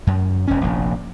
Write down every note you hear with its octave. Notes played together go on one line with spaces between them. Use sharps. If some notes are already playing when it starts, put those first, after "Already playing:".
F#2
E1 C#4
F1 A#1